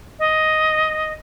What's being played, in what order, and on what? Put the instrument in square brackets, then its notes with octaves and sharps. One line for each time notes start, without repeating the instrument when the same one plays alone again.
[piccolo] D#5